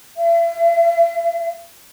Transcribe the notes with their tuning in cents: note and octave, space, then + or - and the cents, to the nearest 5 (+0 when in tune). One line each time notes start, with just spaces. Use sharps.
E5 +40